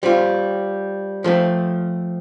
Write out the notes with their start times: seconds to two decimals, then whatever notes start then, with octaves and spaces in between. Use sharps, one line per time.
0.03 G3 C4 F4
1.24 F3 A3 C4